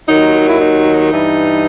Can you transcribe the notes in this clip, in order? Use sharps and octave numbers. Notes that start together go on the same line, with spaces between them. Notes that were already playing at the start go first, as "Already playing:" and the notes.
D#2 D#3 F#3 D#4
E4
D#4
G2 E3 G3